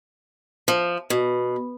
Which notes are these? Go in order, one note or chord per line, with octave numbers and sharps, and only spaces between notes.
F3
B2